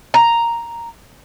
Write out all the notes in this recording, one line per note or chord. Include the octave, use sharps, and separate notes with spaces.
A#5